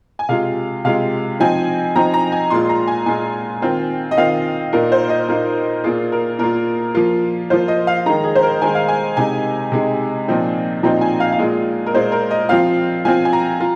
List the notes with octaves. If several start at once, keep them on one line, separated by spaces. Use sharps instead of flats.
G#5
C3 G#3 F4 F5
C3 G#3 F4 F5
F3 C4 D#4 G#5
F3 C4 D#4 A#5
A#5
G#5
A#2 G#3 F4 C6
A#5
G#5
A#2 G#3 F4 G#5
D#3 C4 F4
D#5
D#3 C4 F4 F5
A#2 A#3 D#4 A#4
C5
D#5
A#2 A#3 D#4 A#4
A#2 A#3 F4 G#4
A#4
A#2 A#3 F4 A#4
F3 A#3 F4
F3 A#3 F4 C5
D#5
F5
D#3 G#3 D#4 A#5
G#4
C5
A#4
D#3 G#3 D#4 G#5
F5
G#5
C3 G#3 D#4 G#5
C3 G#3 D#4
A#2 F3 C4 D#4
A#2 F3 C4 D#4 A#5
G#5
F5
F5
A#2 G#3 F4 D#5
A#4
A#2 G#3 F4 C5
A#4
D#5
F3 C4 F4 F5
F3 C4 F4 G#5
G#5
A#5
F4